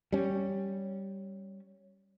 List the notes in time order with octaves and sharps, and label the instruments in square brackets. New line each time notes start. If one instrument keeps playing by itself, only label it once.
[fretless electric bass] G3 C#4